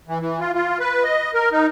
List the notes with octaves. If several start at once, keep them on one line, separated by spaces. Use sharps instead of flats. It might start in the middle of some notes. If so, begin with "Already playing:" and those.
E3
E3
F4
F4
B4
D#5
A#4
D#4